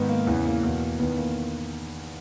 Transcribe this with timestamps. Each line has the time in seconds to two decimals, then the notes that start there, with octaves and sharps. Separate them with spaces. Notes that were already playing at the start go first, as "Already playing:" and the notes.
Already playing: G#2 D#3 B3
0.09 A#3
0.26 E2 C#3 E3 B3
0.45 A#3
0.63 E2 B2
0.99 E2 D#3 B3
1.17 A#3